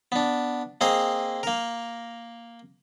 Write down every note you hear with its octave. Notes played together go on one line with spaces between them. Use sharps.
B3 D4
A#3 C4 G#4 D#5
A#3 A#4